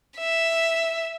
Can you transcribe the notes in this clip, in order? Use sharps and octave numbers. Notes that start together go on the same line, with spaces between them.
E5